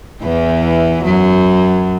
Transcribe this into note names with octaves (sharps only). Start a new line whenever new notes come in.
E2 E3
F#2 F#3